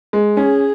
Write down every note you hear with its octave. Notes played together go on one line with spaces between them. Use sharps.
G#3
C#4 G#4